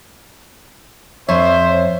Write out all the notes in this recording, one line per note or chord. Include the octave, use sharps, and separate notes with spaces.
F2 C5 C#5 E5